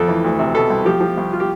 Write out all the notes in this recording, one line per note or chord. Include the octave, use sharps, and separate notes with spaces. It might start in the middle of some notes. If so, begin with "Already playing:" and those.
Already playing: F2 A4
E3
D2
C3
B2 A4
C2
F3 G4
F3
C2
F4
G4